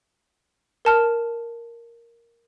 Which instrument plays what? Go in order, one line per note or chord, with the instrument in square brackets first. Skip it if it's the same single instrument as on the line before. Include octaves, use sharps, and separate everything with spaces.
[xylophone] A#4 A5 F6